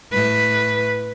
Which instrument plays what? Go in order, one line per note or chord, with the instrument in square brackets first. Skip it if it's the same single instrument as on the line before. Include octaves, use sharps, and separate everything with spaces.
[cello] A2 B4